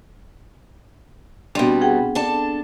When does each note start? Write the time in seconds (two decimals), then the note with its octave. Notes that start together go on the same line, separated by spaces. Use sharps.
1.55 B2 G3 B3 C4 D4
1.81 G#4 F#5 G5
2.15 D4 A4 A5